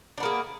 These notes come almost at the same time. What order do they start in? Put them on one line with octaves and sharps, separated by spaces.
D4 B3 A#3 G#4